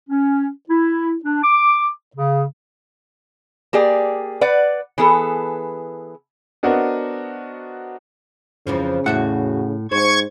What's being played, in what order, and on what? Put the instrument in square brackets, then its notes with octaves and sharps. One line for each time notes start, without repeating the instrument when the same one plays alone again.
[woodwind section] C#4
E4
D4
D6
C#3
[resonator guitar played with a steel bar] A#3 G4 G#4 D5
B4 D5 F#5
E3 B3 G#4 A4
[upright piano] B3 D4 F#4 A#4 C5 D#5
[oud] F2 E3 F3 [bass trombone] C#3
[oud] E2 F#4 E5 [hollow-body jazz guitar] A2 F#5
[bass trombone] G#2 [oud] C5 [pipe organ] C#6 G#6